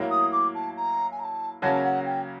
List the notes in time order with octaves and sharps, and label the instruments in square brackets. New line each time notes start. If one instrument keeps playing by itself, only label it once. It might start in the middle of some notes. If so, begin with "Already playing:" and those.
Already playing: [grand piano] A2 F#3 A#3
[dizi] D#6
D6
A5
A#5
G#5
A#5
A5
[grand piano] C#3 F#3 A#3 C#4 F#4 [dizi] A5
[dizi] F#5
G5